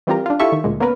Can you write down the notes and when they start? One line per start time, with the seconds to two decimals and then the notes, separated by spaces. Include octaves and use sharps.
0.07 E3 G3 C4 F4 G4 A#4
0.26 D4 F4
0.40 E4 F4 G4 A4 E5 C#6
0.52 D#3
0.64 D2 A#2 G#3
0.80 A#3 B3 C#4 A#4 B4